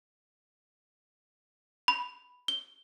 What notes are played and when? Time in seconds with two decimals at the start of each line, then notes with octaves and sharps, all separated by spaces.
1.88 B5
2.48 G7